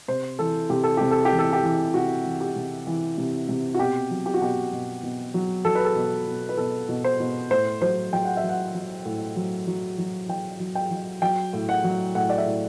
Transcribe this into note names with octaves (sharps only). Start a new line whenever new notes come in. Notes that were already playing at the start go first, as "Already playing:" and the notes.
C3 C5
E3 A4
C3 G4
A4
C3 G4
A4
G4
E3
A4
G4
E3
C3 F#4
E3
G4
C3
E3
C3
C3
F#4
B2 G4
F#3
G4
F#4
B2 G4
B2
B2
F#3
F#3 A4
B4
A4
B2
B2
B4
B2 A4
B2
C5
B2
A2 C5
F#3 C5
F#3 G5
F#5
E5
F#3
F#5
F#3
A2
F#3
F#3
F#3
F#3 G5
F#3
G5
F#3
F#3 G5
A2
F#5
F#3
A2 F#5
D5
E5
A2